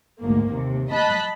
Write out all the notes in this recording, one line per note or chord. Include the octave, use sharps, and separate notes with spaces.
A1 D2 G#2 A#3
D#2 C3
D#5 A5 B5 F#6